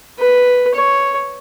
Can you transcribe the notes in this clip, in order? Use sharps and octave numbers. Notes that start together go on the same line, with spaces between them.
B4
C#5